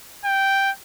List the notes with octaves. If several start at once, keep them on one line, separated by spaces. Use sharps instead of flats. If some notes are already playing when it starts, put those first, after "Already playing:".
G5